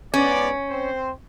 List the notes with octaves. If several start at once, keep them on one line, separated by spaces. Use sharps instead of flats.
G#2 B3 C#4 D5
C4 C5